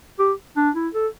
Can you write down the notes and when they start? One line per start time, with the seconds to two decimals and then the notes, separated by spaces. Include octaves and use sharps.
0.19 G4
0.57 D4
0.75 E4
0.94 A4